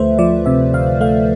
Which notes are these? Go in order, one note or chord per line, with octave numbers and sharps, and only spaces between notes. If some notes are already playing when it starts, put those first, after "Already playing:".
Already playing: D2 F3 A3 B4 C5 E5
F3 D5
C3 E5
D2 F5
A3 F5